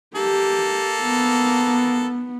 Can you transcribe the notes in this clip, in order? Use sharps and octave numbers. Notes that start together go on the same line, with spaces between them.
A#3 G4 A4
B3